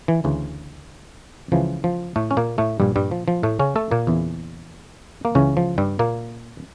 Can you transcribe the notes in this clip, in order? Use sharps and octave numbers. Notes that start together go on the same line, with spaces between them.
E3
D2 C#3 E3
C#2 C#3 E3 F3
F3
A2 A3
C#4
A#2 A#3
A2 A3
A#1 G2 A#2 G3
G2 G3
F3
F3
A2 A3
C#3 C#4
A3 A4
A#2 A#3
E2 C#3 E3
A#3
C#2 C#3 E3 C#4
F3
G2 G3
A#2 A#3